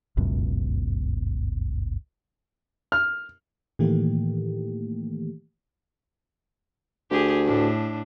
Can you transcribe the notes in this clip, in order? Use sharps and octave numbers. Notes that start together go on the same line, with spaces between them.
G1 C#2 F#2 B2
F6
A2 D#3 E3 A3 A#3 G4
D2 G4 G#4
A2 D4